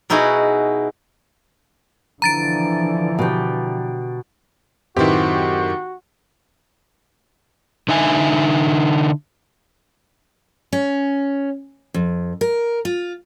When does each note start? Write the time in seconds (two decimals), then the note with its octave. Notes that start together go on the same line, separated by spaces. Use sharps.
0.10 B2 D#4 E4 F#4 G#4
2.22 D3 E3 F3 A#5 A6 D7
3.19 B2 G4
4.97 F#2 A2 D#3 C4 E4 F#4 G4 B4
7.89 D3 D#4 E5 G#5
10.73 C#4
11.94 F2
12.41 A#4
12.85 F4